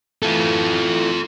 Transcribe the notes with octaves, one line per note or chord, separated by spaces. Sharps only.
E3 A3 F4 A4